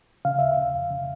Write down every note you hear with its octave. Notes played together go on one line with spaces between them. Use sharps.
C#3 F5
D#2 E5
F5
C#3
F2
C#3